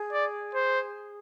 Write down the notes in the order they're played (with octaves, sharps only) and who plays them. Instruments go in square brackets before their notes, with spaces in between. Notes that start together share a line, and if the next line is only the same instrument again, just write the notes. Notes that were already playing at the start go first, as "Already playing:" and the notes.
Already playing: [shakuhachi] G#4
[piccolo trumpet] D5
C5